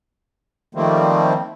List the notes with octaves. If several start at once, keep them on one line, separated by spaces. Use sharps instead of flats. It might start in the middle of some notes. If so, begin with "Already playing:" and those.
D#3 F3 G3 A3 A#3 C4